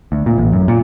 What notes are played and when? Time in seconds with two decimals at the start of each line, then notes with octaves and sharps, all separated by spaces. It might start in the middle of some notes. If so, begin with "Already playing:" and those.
0.12 D2
0.26 A#2
0.38 A1
0.53 F#2
0.68 A#2